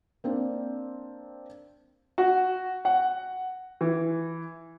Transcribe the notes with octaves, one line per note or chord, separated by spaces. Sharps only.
A#3 C4 D4
F#4
F#5
E3